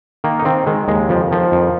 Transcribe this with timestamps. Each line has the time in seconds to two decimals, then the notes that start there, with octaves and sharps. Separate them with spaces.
0.24 D#3 A#3
0.39 D#4
0.45 D#3 C4
0.66 D#3 G#3
0.88 D#2 G#3
1.09 F2 F3
1.31 D#3 F3
1.52 F2